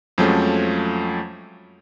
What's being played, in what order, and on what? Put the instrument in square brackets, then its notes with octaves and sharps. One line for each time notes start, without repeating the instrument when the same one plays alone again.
[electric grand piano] F2 F3 F#3 G#3 A3 C#4